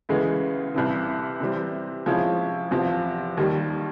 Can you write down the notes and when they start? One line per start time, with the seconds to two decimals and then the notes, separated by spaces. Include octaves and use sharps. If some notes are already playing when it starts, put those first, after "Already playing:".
0.09 D2 C#3 E3 G#3 B3
0.74 C2 C3 E3
1.40 C3 E3 G3 C4
2.06 C3 F3 G#3 C#4 E4
2.71 E2 C3 F3
3.37 D#2 D#3 G3